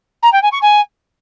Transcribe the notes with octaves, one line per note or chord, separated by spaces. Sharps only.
A#5
G5
G#5
C#6
G#5